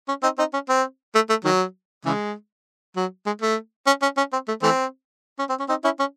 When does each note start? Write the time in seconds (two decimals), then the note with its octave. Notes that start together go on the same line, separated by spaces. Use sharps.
0.08 C#4
0.23 C4 D#4
0.38 C4 D#4
0.53 C#4
0.69 C4
1.15 A3
1.30 A3
1.44 D#3 F#3
2.05 C#3 E3 G#3
2.96 F#3
3.26 G#3
3.42 A3
3.87 C#4
4.02 C#4
4.17 C#4
4.33 C4
4.48 A3
4.63 E3 A3 C4
5.39 C#4
5.49 C4
5.59 C#4
5.69 C4 D#4
5.84 C#4 E4
5.99 C#4